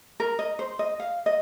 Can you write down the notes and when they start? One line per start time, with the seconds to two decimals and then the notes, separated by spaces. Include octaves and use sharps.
0.20 A#4
0.39 D#5
0.59 C5
0.79 D#5
1.00 F5
1.26 D#5